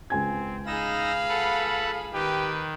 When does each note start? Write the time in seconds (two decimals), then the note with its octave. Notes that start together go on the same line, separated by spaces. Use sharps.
0.10 C#2 C4 G#5 G#6
0.67 D#4 G#4 F5 B5 E6 A#6
1.29 A4 B4 F#5
2.13 D#3 G4 B4